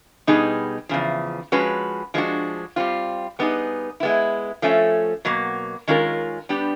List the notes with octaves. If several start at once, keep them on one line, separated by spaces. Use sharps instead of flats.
B2 G3 B3 D#4 G#4
E2 C#3 F3
F3 G#3 C#4 F#4 B4
F3 G#3 B3 D4 F#4
G3 C4 F4
G3 B3 D#4 G#4
G#3 B3 E4
F3 A3 C#4
B2 F#3 A#3
D#3 G#3 C#4 F4 A#4
G3 B3 D4 G4